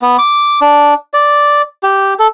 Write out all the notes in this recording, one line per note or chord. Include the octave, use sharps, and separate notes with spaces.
B3
D6
D4
D5
G4
A4